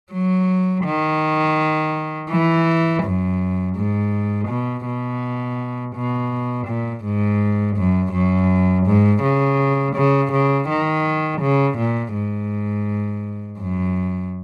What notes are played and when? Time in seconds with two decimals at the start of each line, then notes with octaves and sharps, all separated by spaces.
0.12 F#3
0.85 D#3
2.31 E3
3.03 F#2
3.76 G#2
4.48 B2
4.86 B2
5.95 B2
6.67 A#2
7.04 G#2
7.77 F#2
8.13 F#2
8.87 G#2
9.23 C#3
9.96 C#3
10.32 C#3
10.69 D#3
11.41 C#3
11.78 A#2
12.14 G#2
13.59 F#2